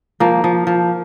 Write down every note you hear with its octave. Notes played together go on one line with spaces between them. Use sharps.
F3 A#3
F3
F3